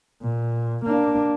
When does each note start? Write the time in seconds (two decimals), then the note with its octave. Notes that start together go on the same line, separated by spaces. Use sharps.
0.22 A#2
0.85 A#3 D4